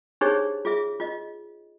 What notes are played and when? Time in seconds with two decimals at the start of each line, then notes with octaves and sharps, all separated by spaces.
0.21 D4 D#4 G4 G#4 C5 C#5
0.65 F4 G#4 E5
1.00 F4 D#5